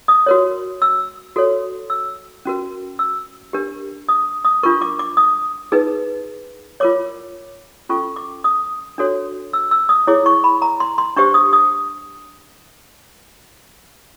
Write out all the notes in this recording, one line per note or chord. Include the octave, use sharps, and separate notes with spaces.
D#6
F#4 A#4 C#5
E6
F#4 A4 C#5
E6
C#4 F#4 A#4
E6
D4 G4 A#4
D#6
D#6
D4 F4 A#4 C#6
D6
D6
D#6
D#4 G#4 B4
F4 A#4 C#5 D6
C#4 F4 A4 C#6
D6
D#6
D4 F#4 A4 C#5
E6
E6
D#6
E4 G#4 C#5 D6
C#6
B5
A#5
C6
C6
D4 G4 C5 C#6
D#6
D#6